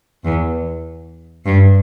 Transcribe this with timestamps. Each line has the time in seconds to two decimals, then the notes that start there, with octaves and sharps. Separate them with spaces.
0.24 E2
1.45 G2